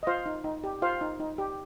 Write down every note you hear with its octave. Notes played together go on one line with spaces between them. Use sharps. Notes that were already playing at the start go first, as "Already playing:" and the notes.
D#5
F4 C5 F5
D#4
D#4
G4
F4 C5 F5
D#4
D#4
G4